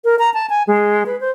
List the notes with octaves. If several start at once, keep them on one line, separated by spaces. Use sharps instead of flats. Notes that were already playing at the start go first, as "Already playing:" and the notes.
A#4
A#5
A5
G#5
G#3
B4
C5